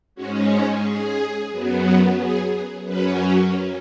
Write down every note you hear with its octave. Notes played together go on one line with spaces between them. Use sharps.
G#2 G#3 C#4 F#4
G#4
G#4
F#2 F#3 B3
G#4
F#2 F#3 C#4 B4